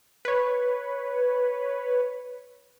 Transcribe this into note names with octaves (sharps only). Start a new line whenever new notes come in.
B4 C#5